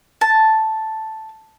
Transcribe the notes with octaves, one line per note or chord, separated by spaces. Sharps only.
A5